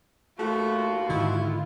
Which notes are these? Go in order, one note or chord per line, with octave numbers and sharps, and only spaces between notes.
D#2 F3 A3 F4 F#4
G#2 D3 D#3 E4